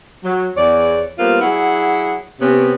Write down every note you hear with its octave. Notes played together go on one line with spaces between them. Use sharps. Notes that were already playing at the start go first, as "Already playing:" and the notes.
F#3
E2 C#5 D5
G3 A#3 B3 F4 C5 F5
F#3 E4 G#4 F#5
C3 B3 C#4